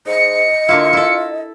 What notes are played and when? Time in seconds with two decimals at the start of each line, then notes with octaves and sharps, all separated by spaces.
0.07 G#2 D#5 C#7
0.68 D3 A#3 E4 F4
0.93 E4 A4